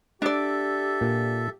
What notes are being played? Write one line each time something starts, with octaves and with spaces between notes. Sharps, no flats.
D4 G4 A4 D5 E5
A#2